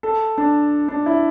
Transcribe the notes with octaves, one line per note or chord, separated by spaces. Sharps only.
A4
D4
D4
E4